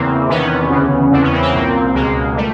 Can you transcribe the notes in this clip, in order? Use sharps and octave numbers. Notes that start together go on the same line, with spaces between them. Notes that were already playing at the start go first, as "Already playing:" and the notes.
Already playing: E2 C#3 E3 A#3 C4
E2 C3 D#3 B3 C#4
D2 C#3 E3
E2 C#3 E3 C4 D4
B3 C#4
A#3 C4
A#3 C4
C2 A#2
C#2 B2 G#3 A#3
G3 A3